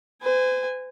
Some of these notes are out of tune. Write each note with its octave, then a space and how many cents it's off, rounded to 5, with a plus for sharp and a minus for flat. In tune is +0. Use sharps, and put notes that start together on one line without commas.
C5 -45 G#5 -15